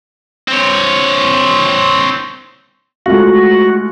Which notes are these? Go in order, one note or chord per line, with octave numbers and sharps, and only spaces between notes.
C4 C#5
G#3 A3 F4 F#4